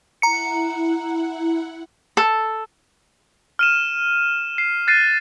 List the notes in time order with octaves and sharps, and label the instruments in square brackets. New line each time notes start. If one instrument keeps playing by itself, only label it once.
[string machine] E4 F#5 [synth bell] A#5 C#7
[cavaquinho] A4
[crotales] F6 D#7 E7
C7
F#6 A6 C7 D#7